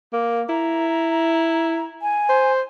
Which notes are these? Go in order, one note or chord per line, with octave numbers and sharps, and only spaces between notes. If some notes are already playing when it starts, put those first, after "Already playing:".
A#3
E4 A#5
G#5
C5